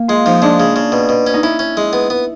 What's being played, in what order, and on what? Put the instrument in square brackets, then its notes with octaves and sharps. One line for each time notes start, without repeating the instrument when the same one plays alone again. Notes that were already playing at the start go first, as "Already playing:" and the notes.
Already playing: [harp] A#3
[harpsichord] G#3 [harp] F4
[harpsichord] F3 [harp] D#4
[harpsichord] G#3 [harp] D4
[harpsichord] C#3
C#3
B2
B2
C#4
[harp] D#4
[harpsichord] C#4 [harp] E4
[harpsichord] C#4
G#3
B3
B3